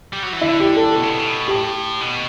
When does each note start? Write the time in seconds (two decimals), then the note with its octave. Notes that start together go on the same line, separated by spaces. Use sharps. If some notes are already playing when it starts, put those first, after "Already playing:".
0.13 G3
0.23 F#3
0.33 E3
0.41 D3 E4
0.60 G4
0.76 A4
0.95 B2
1.03 C#3
1.10 B2
1.19 C#3
1.27 B2
1.47 A2 G4
2.00 B2